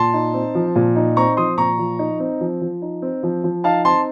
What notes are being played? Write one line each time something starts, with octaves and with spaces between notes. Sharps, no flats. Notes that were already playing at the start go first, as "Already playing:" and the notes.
Already playing: A#2 A5 C6
D#4
C4
F3
A#2
D#4
C4 A#5 C#6
F3 C6 D#6
A#2 A#5 C#6
F3
D#4
C4
F3
F3
D#4
C4
F3
F3
D#4 F5 A5
C4 A5 C6